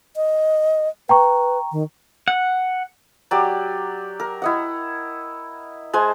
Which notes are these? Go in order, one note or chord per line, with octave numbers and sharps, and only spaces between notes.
D#5
B4 G5 A#5 C#6
D#3
F#5
F#3 G4 D5
A#4
E4 D#5 F#5
G#3 C5 G#5 A5